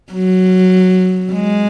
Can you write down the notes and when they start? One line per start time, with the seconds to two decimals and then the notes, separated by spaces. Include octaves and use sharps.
0.12 F#3
1.32 G#3